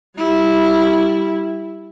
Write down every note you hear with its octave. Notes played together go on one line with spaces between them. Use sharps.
G3 E4